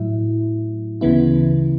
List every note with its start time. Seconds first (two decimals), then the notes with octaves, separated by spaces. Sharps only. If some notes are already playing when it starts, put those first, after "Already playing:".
Already playing: A2 F#3 E4
1.01 D2 C#3 E3 B3 E4